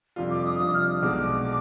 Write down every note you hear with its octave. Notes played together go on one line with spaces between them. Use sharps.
F2 C3 G3 D4 F4
D6
D#6
F2 C3 G3 D4 F4 D#6
F6
D#6
B1 B2 G#3 D4 D6